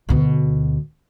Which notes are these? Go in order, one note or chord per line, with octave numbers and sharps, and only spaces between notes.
D2 B2